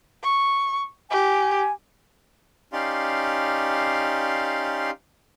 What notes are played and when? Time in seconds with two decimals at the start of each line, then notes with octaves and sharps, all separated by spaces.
0.23 C#6
1.11 G4 G#5
2.73 C#4 D#4 G4 D5 F5 C6